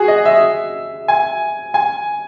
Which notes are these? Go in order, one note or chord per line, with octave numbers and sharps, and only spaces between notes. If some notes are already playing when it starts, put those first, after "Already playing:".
Already playing: F#4 G#4
D#5
E5
G#5
G#5